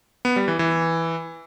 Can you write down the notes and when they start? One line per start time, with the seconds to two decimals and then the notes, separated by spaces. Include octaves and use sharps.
0.25 B3
0.36 G3
0.48 E3
0.59 E3